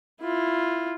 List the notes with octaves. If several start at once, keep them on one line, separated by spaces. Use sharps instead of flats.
E4 F4